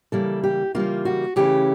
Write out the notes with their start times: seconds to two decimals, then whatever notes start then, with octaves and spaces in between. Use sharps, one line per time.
0.12 C#3 E3 G3 A#3 A4
0.44 G4
0.75 C#3 E3 G3 A#3 F4
1.05 F#4
1.36 C#3 E3 A3 C#4 G4